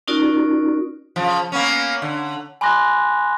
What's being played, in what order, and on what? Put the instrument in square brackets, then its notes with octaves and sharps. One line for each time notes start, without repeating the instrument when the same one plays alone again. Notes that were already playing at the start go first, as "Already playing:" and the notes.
[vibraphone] C#4 D#4 F4 F#4 A#4 D5
[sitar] C#3 F3
A#3 B3 C#4
D3
[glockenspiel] G#5 B5 C6 D6 F#6 A#6